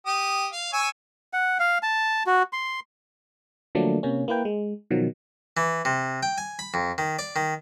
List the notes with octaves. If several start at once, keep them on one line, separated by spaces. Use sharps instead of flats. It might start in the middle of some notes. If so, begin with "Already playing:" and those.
G4 D#6
F5
C#5 G#5 E6
F#5
F5
A5
F#4
C6
D3 F3 F#3 A3 A#3 D4
C3 A#3 C#4
A#3 E4 B4 G5
G#3
B2 D#3 F3 F#3
E3
C3
G5
G#5
B5
F2
D#3
D5
D#3